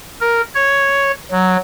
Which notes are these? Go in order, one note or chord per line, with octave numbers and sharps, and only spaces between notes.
A#4
C#5
F#3